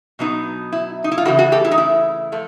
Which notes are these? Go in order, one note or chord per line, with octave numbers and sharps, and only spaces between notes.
B2 F#3 B3 D#4
E4
D#4
E4
F4
C#3 E3 A3 E4 F#4
F#4 G#4
G4 A4
E4
D#4
E4
F3 A3